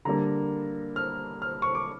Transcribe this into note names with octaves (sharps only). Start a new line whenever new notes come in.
D3 G3 A#3 A#5
F6
F6
C#6
D6